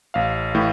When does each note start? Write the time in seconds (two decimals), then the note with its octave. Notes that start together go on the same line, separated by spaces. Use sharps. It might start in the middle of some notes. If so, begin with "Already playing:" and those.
0.14 A1 F5
0.55 A2 E3